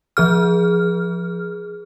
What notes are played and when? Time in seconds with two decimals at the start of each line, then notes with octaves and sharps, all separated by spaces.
0.17 F3 G#4 F6